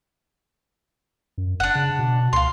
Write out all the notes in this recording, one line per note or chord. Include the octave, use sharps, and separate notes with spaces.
F#2
F#1 D4 F#5
C#3
B2
C#2 F5 C6